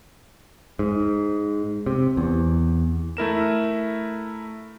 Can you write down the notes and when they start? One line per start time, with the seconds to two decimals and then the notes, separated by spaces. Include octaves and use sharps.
0.79 G#2
1.86 C3
2.17 E2
3.17 A3 E4 A#4 E7